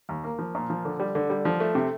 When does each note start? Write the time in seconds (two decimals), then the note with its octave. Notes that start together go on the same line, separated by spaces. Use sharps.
0.09 D#2
0.24 A#3
0.39 F3
0.55 A#2
0.70 F3
0.85 D3
0.99 G3
1.15 D3
1.30 G3
1.45 F3
1.60 A3
1.75 C3